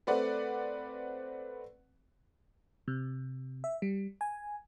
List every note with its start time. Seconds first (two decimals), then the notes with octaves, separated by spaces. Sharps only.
0.07 A3 C4 B4 D5 F#5
2.88 C3
3.64 E5
3.82 G3
4.21 G#5